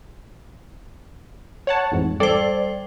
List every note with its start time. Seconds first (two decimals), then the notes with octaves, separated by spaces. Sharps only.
1.67 C#5 F#5 A5
1.92 A1 F2 G#2
2.20 G3 A4 C5 D5